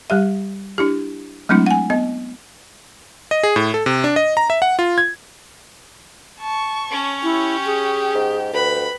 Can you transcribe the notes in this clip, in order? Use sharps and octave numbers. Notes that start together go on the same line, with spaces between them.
G3 G4 E5
D4 E4 G4
F#3 G#3 A3 C4 D4 E4
F#5 G#5
B3 D#5
D#5
G#4
A2
A4
C3
D4
D#5
A#5
E5
F#5
F4
G#6
A5 C#6
C#4 C#5
E4 G4
G#4
G#2
D2 B4 B5